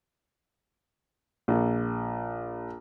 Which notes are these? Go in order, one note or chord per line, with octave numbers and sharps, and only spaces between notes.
A#1